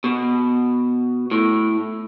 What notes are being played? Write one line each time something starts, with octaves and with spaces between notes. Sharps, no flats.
B2
A2